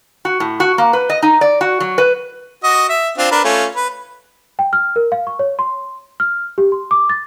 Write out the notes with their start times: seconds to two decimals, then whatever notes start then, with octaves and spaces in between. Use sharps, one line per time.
0.25 F#4
0.40 A2
0.60 F#4
0.78 A#3
0.93 B4
1.10 D#5
1.22 D#4
1.41 D5
1.61 F#4
1.80 F#3
1.98 B4
2.63 F#4 D#5
2.89 E5
3.18 C4 D4 F4
3.31 D4 A#4 B4
3.44 A3 C#4 F4
3.75 B4
4.59 G5
4.73 F6
4.96 A#4
5.12 F5
5.27 C#6
5.39 C#5
5.59 C6
6.20 F6
6.58 G4
6.72 C6
6.91 D6
7.10 A6